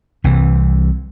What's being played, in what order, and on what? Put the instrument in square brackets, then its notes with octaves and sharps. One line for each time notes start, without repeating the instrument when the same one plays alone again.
[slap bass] C2 C3 E3